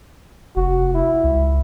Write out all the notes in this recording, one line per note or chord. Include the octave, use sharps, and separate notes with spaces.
F1 F#4
E4
C#2